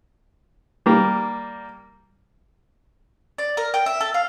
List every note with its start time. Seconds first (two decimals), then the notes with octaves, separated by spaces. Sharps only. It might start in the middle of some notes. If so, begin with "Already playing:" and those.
0.86 G3 A#3
3.38 D5
3.57 A#4
3.74 G5
3.86 E5
4.01 A4
4.14 F5